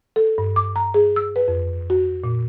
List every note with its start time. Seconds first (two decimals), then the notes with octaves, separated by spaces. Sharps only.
0.16 A4
0.38 G2
0.56 D6
0.76 A#5
0.94 G#4
1.16 E6
1.36 B4
1.48 F2
1.90 F#4
2.24 A#2